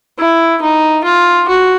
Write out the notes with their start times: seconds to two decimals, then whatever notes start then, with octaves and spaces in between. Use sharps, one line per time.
0.19 E4
0.62 D#4
1.04 F4
1.48 F#4